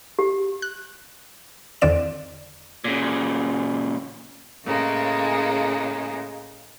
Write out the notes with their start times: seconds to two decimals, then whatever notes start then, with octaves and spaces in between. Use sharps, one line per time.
0.19 G4
0.62 F#6
1.81 E2 D3 D#3 C4 D5 E7
2.84 A#2 C#3
4.64 A2 C#3 G#3 A#3